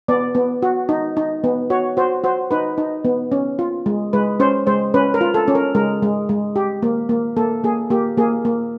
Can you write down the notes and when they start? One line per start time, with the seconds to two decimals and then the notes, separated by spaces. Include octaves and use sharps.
0.08 B3 D5
0.35 B3
0.62 F#4
0.89 D#4
1.17 D#4
1.44 B3
1.70 F#4 C#5
1.97 F#4 C5
2.24 F#4 C5
2.51 D#4 B4
2.78 D#4
3.05 B3
3.32 C#4
3.59 F4
3.86 G#3
4.13 G#3 B4
4.40 C#4 C5
4.67 G#3 C5
4.94 C#4 B4
5.14 A#4
5.21 F4
5.34 A4
5.48 C#4
5.55 A#4
5.75 G#3 A#4
6.02 G#3
6.29 G#3
6.56 G4
6.83 A#3
7.09 A#3
7.37 A#3 A4
7.64 A#3 G#4
7.90 A#3 G4
8.17 A#3 G#4
8.45 A#3